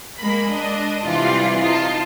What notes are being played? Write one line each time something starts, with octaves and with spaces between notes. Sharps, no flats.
G#3 A#3 B5
D4 D#5
C3 E3 G3 F4 D5
D#4 F4 A5